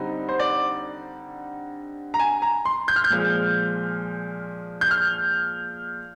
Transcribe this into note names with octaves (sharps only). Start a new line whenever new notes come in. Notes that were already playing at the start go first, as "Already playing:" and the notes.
Already playing: D3 G3 C4 D#4
C5
D5
A#5
G#5
A#5
C6
G6
F6
G6
A#2 F3 G#3
G6
F6